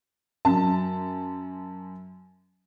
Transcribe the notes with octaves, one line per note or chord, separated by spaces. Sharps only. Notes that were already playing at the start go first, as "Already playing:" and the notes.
F#2 A5